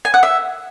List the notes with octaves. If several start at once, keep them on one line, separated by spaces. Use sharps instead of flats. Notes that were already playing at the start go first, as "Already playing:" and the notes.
G#5
F#5
E5